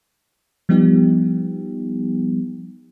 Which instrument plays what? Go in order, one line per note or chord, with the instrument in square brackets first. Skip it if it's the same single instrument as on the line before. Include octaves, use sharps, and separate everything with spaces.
[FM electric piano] F3 G3 B3 D#4 G4